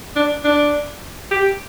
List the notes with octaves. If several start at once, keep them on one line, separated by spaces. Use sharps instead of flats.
D4
D4
G4